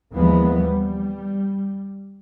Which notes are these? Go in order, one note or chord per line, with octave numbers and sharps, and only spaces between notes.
D#2 E3 F3 G#3 B3
G3